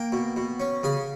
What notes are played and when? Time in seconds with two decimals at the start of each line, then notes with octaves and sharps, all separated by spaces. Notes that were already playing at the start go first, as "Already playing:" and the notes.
Already playing: A#3 G5
0.12 B2
0.36 B2
0.60 C#4
0.83 C#3 G#4